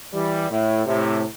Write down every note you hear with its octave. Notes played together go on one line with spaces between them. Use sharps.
E3 G3
A2
A2 C3